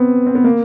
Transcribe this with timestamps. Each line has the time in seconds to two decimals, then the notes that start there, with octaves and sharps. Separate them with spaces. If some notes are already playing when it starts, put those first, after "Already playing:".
Already playing: B3 C4
0.26 C4
0.35 B3
0.44 A#3